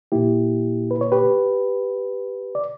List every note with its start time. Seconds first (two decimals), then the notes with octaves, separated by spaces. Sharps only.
0.12 A#2 A#3 E4 G4
0.91 B4
1.01 C#5
1.12 G4 B4
2.55 D5